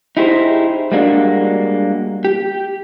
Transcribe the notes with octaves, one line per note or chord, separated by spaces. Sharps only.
D#4 E4 G4 G#4 B4 C5
G3 G#3 A#3 D4 F#4
G4